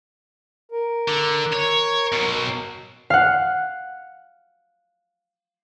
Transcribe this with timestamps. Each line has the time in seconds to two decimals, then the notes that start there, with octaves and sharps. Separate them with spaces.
0.72 A#4
1.08 D3
1.53 C#5
2.13 B2 F#3
3.10 F5 F#5